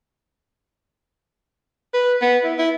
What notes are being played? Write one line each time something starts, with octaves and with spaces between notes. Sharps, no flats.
B4
B3
E4
E4